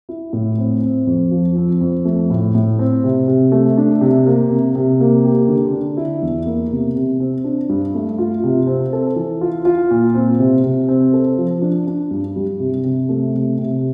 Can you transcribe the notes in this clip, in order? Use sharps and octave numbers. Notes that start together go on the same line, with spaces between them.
E4
A2
C4
C4
F2
F3
C4
F2
A3
A2
A2
C4
C3
C3
A3
D4
C3
A#3
C3
C3
A#3
G4
D3
D4
E4
E2
A#3
C3
C3
C4
D4
G2
A3
F4
C3
C4
A4
E3
F4
F4
A#2
C4
C3
C3
C4
A4
F3
D4
D4
G2
G3
C3
C3
A3
C3
C3